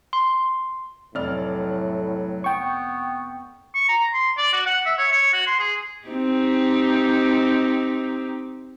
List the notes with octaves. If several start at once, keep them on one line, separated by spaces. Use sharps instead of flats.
C6
F1 A2 F#3 D5 F6
B3 G5 C#6
C#6
A#5
C6
D5
F#4
F#5
E5
C#5
C#5
F#4
C6
G#4
C4 D#4 G4